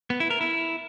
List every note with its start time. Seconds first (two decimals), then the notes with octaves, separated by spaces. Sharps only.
0.10 B3
0.20 E4
0.30 A#4
0.41 E4